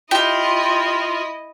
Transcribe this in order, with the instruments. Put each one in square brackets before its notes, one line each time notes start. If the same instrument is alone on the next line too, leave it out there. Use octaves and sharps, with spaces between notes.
[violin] E4 D#5 [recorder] F4 [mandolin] G4